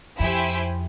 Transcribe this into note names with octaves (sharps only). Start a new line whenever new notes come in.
F2 E4 G4 C5 E5 G#5